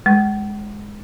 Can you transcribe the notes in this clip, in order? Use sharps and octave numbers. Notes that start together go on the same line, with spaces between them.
G#3